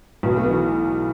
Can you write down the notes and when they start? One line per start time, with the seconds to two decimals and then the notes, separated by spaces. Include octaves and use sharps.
0.23 B1 B3
0.37 A3
0.44 B3
0.50 E3